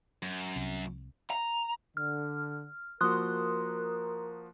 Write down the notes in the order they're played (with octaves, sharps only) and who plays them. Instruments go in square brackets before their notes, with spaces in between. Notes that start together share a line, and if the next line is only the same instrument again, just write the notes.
[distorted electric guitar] F#2
[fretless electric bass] C2
[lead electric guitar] A#5
[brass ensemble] D3 [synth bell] F6
[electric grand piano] F3 A#3 F#4 [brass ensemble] A#4 [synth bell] C6 D#6 F#6